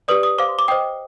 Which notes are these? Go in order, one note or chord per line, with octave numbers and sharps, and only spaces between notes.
G4 B4 D5 D#6
D#6
C5 F5 D6
C6
D6
C5 D#5 G5 D#6